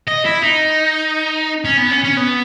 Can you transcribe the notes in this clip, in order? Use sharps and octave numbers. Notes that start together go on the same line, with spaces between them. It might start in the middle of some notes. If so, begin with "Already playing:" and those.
D#5
E4
D#4
C#4
B3
C#4
C#4
B3